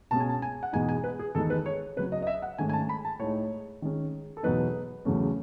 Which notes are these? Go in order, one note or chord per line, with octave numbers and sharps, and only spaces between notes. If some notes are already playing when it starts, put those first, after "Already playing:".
B2 G#3 C#4 A5
G#5
A5
G#5
F#5
E2 B2 G#3 D#4 G#5
G#5
B4
G#4
E2 D#3 G#3 D#4 A4
B4
C#5
C#3 F#3 C#4 B4
D#5
D#5
E5
F#5
G#2 D#3 A3 C#4 G#5
G#5
A5
B5
A5
A2 G#3 D#4 C#5
D#3 G#3 C#4
A4
E2 B2 F#3 B3 D#4 B4
E2 C#3 F#3 A3 C#4